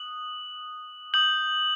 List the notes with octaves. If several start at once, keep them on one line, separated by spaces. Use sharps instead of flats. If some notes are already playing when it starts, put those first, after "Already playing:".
Already playing: D#6 F#6 F#7
D#6 G6 F#7